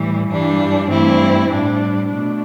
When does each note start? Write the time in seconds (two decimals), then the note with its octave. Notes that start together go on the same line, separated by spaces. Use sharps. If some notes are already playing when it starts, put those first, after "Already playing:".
Already playing: A2 E3 G3
0.28 G2 E3 G3 D4
0.89 G2 E3 A3 C4 E4
1.49 A2 G3 D4
2.09 B2 A3 D4